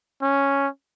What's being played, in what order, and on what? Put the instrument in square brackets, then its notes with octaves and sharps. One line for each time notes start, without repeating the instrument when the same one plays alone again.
[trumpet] C#4